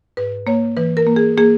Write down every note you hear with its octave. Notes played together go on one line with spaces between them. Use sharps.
G#2 B4
A#3 C#5
E3 B4
A#4
A#3
G#4
A#3 G#4